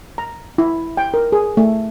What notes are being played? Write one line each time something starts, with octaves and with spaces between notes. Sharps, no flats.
A#5
E4
G5
A#4
G#4
A3